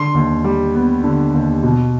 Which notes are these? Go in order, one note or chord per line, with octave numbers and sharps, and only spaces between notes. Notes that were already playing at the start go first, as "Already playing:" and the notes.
Already playing: D3 C6
D#2
G3
B3
D3
D#2
B2